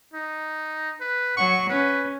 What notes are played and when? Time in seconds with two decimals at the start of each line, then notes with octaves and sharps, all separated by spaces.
0.14 D#4
1.01 B4
1.37 F#3 F#5 C#6
1.69 C#4 B4